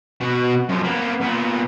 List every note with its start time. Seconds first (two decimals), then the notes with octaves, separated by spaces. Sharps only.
0.21 B2 F#4
0.68 F#2 F3
0.84 A#3 B3
1.20 A#2 B3